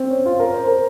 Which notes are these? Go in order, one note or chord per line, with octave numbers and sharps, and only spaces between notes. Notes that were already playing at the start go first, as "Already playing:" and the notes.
Already playing: C4
C#4
F4
A#4
C5
A#4